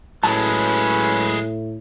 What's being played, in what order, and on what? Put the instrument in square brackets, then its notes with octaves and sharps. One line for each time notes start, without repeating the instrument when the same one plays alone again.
[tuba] A2 [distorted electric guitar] F#3 G#3 [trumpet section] C#4 B4 [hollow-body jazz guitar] A5